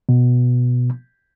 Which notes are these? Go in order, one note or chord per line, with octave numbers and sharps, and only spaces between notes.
B2